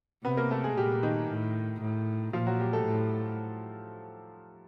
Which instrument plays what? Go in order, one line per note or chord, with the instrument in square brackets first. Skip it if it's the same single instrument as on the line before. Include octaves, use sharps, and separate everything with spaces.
[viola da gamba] C3 [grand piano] B3 B4
[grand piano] A#3 A#4
A3 A4
G#3 G#4
[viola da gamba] A#2 [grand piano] G3 G4
[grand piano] D#3 D#4
[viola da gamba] A2
A2
[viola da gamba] A#2 [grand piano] F3 F4
[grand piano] F#3 F#4
G3 G4
A3 A4
[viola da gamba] A2